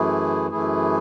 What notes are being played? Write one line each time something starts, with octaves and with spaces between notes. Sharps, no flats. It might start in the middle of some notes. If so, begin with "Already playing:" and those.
Already playing: F#2 E3 A3 E4 G#4
F#2 E3 A3 E4 G#4